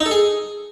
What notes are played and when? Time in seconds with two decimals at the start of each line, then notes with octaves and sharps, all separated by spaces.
0.01 D#4
0.06 A4
0.11 G#4